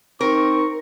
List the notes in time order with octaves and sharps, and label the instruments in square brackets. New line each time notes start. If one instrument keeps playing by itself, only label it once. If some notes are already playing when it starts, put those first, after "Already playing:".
[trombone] C4 [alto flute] D#4 [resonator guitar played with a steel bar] A#4 [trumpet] C#6